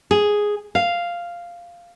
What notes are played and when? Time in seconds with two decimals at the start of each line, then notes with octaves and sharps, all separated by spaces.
0.11 G#4
0.75 F5